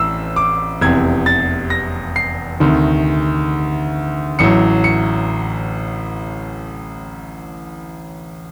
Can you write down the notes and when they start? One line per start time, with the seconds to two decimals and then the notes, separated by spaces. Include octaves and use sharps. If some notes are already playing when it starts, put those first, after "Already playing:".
Already playing: A1 A2 E6
0.36 D6
0.81 F1 E2 C3 G#6
1.26 A6
1.70 A#6
2.16 C7
2.60 D2 C3 D#3
4.39 A1 A2 F#3 C#7
4.84 C#7